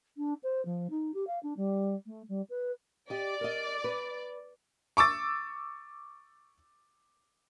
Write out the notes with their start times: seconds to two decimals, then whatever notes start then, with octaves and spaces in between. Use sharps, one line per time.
0.17 D4
0.43 C5
0.65 F3
0.90 D#4
1.14 G4
1.27 F5
1.43 D4
1.57 G3
2.06 A3
2.29 G3
2.50 B4
3.10 G4 D5 D#5
3.41 A#4 D#5
3.84 B4
4.97 C#6 D6 E6 A6